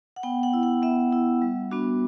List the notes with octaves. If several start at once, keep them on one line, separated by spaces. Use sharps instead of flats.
F#5
B3 G5
F#5
E4
F#5
B3 E5
E4
G3
B3 D4 F#4